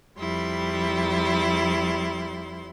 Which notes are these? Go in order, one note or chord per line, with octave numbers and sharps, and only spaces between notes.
F2 G3 E4 C6